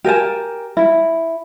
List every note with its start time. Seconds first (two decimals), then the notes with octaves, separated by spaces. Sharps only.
0.04 G4 A#4 G#5 A5
0.77 E4